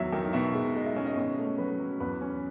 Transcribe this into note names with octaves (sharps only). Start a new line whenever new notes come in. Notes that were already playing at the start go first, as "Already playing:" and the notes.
Already playing: E2 D#3 F#3 E5
D#3
B2 E5
G#3
G#3 D#5
E5
C#4 E5
D#5
B2 C#5
A3
F#3 B4
F#3
E2 B4
C#4